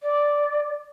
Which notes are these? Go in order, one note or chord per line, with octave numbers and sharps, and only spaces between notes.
D5